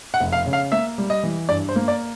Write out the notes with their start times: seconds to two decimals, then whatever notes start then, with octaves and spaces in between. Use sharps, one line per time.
0.14 F#5
0.20 F1
0.33 F5
0.46 C#3
0.53 F5
0.72 A#3 E5
0.98 G3
1.10 D#5
1.23 E3
1.49 G2 D5
1.69 C5
1.76 A#3
1.88 D5